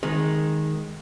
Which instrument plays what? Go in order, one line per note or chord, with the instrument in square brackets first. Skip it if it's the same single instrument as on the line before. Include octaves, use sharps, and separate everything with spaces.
[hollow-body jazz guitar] D#3 G#3